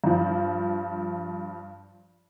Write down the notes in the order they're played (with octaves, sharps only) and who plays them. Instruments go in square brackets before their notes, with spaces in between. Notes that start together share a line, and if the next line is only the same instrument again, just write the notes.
[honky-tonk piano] G2 F3